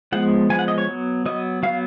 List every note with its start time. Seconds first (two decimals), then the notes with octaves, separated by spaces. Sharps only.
0.12 F3 G#3 B3 F#5
0.49 F3 G#3 B3 G#5
0.59 F#5
0.68 D#5
0.78 C#5
0.87 F#3 B3
1.26 F#3 B3 D#5
1.63 F#3 B3 F5